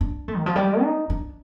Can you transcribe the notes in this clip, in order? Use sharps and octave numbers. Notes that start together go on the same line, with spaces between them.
D4
A3
D#3
F3
G3
D#4
D4